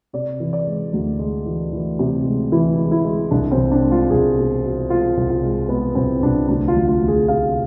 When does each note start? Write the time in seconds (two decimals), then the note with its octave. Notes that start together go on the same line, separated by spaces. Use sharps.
0.13 C3 D5
0.40 E3
0.53 D5
0.67 G#3
0.93 D2
1.19 G#3
1.46 E3
1.72 E3
1.99 C3
2.25 G#3
2.52 E3 E4
2.79 G#3
2.91 E4
3.04 G#3
3.31 C2 D4
3.52 C4
3.57 C2
3.72 D4
3.84 G#3
3.91 F4
4.10 C2 G#4
4.37 B2
4.63 B2
4.89 G#3 F4
5.17 C2
5.30 F4
5.43 G#3
5.69 G#3 B3
5.95 C2 C4
6.22 C2 D4
6.48 D2 D4
6.68 F4
6.76 D2
6.89 F4
7.01 D2
7.08 G#4
7.28 C3 F5